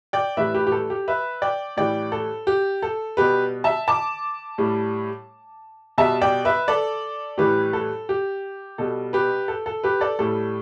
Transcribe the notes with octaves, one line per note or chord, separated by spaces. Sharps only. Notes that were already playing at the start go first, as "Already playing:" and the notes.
D5 G5
A2 E3 G3 B4 E5
G4 B4
G4
A4
G4
B4 E5
D5 G5
A2 E3 G3 D5 G5
A4
G4
A4
B2 G3 G4 B4
E5 A5
A5 D6
A2 G3
B2 G3 E5 A5
D5 G5
B4 E5
A4 D5
A2 E3 G3 G4 B4
A4
G4
B2 G3 A4
G4 B4
A4
A4
G4 B4
A4 D5
A2 G3 A4